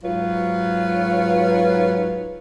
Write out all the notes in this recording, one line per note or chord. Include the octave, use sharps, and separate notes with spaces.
G#2 F#3 F4 B4 C#5